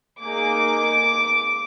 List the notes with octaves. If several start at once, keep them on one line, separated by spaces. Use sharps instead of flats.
A#3 D#4 G#4 D6